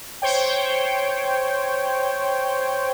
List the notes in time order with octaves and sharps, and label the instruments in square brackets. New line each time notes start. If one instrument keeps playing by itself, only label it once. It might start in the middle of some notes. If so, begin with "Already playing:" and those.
[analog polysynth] C5 C#5 G5